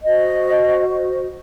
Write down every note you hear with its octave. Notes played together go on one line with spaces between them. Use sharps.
F#4 C5 D#5